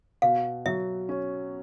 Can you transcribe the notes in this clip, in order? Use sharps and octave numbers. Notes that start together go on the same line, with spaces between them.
B2 F5
F#3 E5
C#4